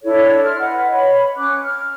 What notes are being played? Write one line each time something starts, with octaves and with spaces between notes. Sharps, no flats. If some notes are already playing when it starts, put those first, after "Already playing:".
D4 E4 A4 C#5
C6 F6
B4 D#5 F#5
C#5 B5
C#4 D6 F#6
F6